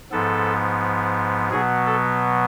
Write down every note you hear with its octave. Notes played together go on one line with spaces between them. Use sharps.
G#2 F3 B3 A4
B2 F#3 B3 G#4
A4